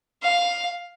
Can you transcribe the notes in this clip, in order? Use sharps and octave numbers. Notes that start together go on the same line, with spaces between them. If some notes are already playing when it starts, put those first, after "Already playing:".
F5